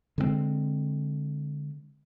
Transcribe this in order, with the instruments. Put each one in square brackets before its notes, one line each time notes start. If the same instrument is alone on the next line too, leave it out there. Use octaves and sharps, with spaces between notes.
[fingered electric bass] D3 G#3 A3 C4